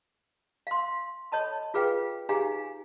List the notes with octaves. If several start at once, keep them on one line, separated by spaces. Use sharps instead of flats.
F5 C6
A4 C#5 D#5 A5 B5
F4 G#4 B4 F5 G5
D#4 G4 G#4 F5 G#5 A#5